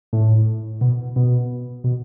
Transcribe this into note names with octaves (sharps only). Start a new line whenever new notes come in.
A2
B2
B2
B2